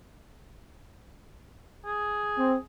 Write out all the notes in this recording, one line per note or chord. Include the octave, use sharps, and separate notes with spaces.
G#4
C4